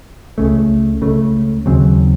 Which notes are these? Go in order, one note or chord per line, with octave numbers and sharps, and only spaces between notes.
C#2 C#3 A3
C#2 C#3 A3
D#2 C#3 F#3 C4